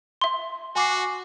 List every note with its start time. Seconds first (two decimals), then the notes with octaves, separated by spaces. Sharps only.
0.21 E5 C6
0.76 F#4 G#5 D6 C7